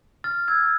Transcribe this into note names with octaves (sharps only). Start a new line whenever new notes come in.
F6 A6
E6 G#6